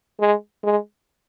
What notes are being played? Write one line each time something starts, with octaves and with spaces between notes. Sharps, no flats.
G#3
G#3